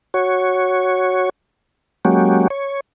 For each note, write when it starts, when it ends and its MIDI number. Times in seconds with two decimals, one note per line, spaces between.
0.14 1.30 66
0.14 1.30 73
2.05 2.48 54
2.05 2.48 56
2.05 2.48 58
2.05 2.48 61
2.05 2.48 66
2.05 2.48 67
2.50 2.80 73